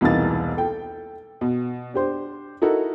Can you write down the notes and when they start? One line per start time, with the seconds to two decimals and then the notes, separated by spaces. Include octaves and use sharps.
0.01 E1 C2 E3 A#3 D#4 A6
0.57 A4 G5
1.41 B2
1.94 D4 G4 C5
2.62 D#4 E4 F#4 A4 A#4